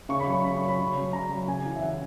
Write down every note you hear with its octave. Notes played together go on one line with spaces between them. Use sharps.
C#3 C#6
B5
F#3 C#6
C#3 B5
C#6
F#3
B5
C#3
F#3
C#3 A#5
F#3
C#3 G#5
E3
E5
C#3 F#5